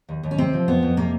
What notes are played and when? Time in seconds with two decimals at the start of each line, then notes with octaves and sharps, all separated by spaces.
0.09 D#2
0.23 D#2
0.31 C#4
0.38 C3 C4
0.53 F3
0.68 F2 B3
0.83 F2
0.97 C3 A#3